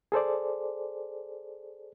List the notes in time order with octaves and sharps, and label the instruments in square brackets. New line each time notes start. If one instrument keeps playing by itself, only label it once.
[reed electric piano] G#4 A4 C5 D5